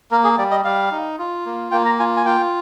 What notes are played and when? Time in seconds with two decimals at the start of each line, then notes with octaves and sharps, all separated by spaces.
0.11 A#3 A#4
0.24 G#4
0.38 G3 D5
0.51 D#5
0.64 G3 F5
0.92 D#4
1.18 F4
1.46 A#3
1.71 A#3 G5
1.85 A#5
1.99 F4 G#5
2.16 G#5
2.26 F4 G5